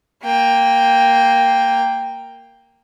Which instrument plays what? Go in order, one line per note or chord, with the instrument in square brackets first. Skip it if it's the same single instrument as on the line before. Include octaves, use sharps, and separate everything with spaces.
[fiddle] A#3 G5